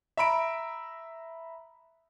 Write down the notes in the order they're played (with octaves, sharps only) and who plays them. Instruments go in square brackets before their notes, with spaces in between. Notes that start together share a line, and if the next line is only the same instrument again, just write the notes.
[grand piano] E5 A#5 B5 D7